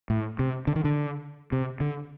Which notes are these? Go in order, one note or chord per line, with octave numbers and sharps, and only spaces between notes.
A2
C3
D3
D#3
D3
C3
D3